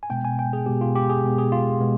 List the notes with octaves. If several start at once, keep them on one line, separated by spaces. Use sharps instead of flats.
G#5
B2 G#3 B3 G5
G#5
G5
G#4
B2 G#3 B3 G4
F4
G4
G#4
B2 G#3 B3
G#4
F4
B2 G#3 B3